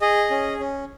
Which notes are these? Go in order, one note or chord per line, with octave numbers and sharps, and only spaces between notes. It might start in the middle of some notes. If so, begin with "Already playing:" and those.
G#4 D#5
C#4
C#4